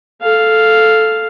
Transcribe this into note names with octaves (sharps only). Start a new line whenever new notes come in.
A4 F5